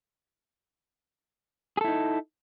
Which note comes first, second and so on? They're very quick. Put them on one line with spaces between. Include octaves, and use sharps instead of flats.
G#4 A4 E4 D#4